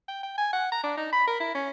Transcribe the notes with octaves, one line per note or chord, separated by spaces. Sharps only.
G5
G5
G#5
F#5
A#5
D4
D#4
B5
A#4
E4
C#4